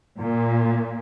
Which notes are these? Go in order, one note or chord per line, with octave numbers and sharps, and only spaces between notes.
A#2